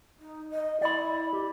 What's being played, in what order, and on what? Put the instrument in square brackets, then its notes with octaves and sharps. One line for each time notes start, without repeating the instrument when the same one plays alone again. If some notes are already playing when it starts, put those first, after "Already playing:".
[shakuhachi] D#4
D#5
[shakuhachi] E4 [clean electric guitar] D5 B5
[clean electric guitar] G4